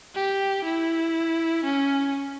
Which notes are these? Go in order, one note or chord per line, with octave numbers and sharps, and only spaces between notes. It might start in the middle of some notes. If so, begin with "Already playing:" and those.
G4
E4
C#4